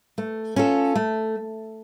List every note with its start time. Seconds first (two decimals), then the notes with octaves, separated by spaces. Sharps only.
0.18 A3
0.56 C#4 F4 A4
0.95 A3